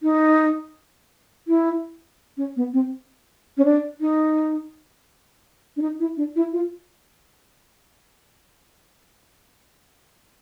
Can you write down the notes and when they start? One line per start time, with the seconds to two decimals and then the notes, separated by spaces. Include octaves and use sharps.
0.03 D#4
1.48 E4
2.37 C#4
2.56 B3
2.73 C4
3.57 C#4
3.65 D4
4.01 D#4
5.77 D4
5.82 D#4
6.00 E4
6.17 D4
6.36 E4
6.53 F4